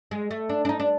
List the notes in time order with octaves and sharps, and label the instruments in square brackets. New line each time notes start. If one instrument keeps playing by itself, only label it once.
[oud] G#3
A3
D4
D4
D#4
D4